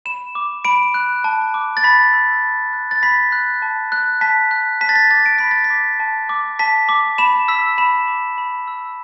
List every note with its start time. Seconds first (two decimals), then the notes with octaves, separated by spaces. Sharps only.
0.05 B5 E7
0.35 D6
0.65 B5 D7
0.94 F#6
1.24 A5
1.54 D6
1.77 A6
1.84 B5 B6
2.13 E6
2.43 A5
2.73 F#6
2.91 A6
3.03 B5 B6
3.32 F#6
3.62 A5
3.92 F#6
4.21 A5 B6
4.51 F#6
4.81 A5 B6
4.89 A6
4.96 B6
5.11 D6 A6
5.26 D7
5.39 B5 B6
5.51 A6
5.64 B6
5.70 D6
6.00 A5
6.29 D6
6.59 A5 B6
6.89 D6
7.18 B5 E7
7.48 E6 B6
7.78 B5 E7
8.08 D6
8.38 B5
8.68 E6